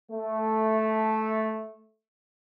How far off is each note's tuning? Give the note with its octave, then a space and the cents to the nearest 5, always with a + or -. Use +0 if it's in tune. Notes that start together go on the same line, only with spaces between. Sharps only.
A3 -5